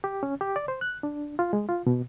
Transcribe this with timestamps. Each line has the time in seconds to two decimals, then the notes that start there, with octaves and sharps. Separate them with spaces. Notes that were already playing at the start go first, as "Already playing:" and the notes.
0.04 G4
0.23 C#4
0.41 G4
0.56 D5
0.68 C5
0.81 F#6
1.03 D4
1.39 F4
1.53 G#3
1.69 F4
1.87 B2